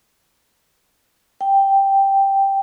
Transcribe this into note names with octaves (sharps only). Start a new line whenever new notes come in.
G5